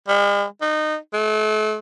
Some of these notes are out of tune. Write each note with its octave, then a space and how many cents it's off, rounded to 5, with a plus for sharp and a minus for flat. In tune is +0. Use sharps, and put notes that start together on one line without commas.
G#3 -45
D#4 -20
A3 -40